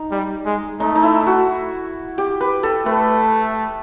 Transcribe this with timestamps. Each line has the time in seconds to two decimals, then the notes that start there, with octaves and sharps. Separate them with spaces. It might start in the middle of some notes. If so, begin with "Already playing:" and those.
Already playing: D#4
0.11 G3
0.46 G#3
0.80 A3 D#4
0.95 D#4
1.03 E4
1.27 F#4
2.18 G4
2.40 B4
2.63 A4
2.86 A3 B4